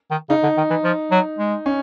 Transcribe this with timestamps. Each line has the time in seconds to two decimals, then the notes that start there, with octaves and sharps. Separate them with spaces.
0.11 D#3
0.29 C#3 D#4
0.43 D3
0.57 D#3
0.70 E3
0.84 F3
1.11 F#3
1.38 G#3
1.66 C#4